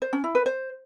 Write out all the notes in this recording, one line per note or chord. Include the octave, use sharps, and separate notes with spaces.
C5
C#4
E4
B4
C5